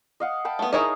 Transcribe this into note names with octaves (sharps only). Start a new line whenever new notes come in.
D#5 F5 F#5
G5 A5 B5
A3 B3
D#4 E4 G#4 A#4 C#5 D#5